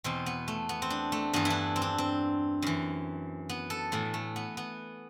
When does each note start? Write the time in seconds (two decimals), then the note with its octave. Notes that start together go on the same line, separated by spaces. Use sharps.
0.04 E2 B2 C4
0.26 B3
0.48 A3
0.69 B3
0.82 C4
0.90 D4
1.12 A3
1.33 G2 E3 B3
1.45 E4
1.50 D4
1.76 C4
1.82 D4
1.98 C4
2.62 F#2 E3
3.49 B3
3.70 A4
3.92 A2 E3 B3
4.14 A3
4.36 B3
4.57 B3